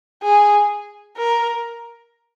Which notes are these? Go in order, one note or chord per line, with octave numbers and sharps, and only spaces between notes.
G#4
A#4